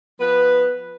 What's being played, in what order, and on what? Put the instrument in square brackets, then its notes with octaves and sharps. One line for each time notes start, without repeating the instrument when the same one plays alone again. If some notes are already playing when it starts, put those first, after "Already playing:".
[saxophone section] F3 B3 B4